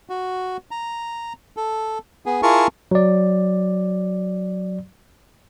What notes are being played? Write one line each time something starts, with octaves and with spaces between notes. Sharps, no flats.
F#4
A#5
A4
B3 G#4
E4 F4 G#4 A#4 A5 C#6
F#3 D5